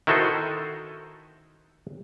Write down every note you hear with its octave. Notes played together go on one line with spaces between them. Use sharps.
D#3 E4 F#4 A4 C5 D#5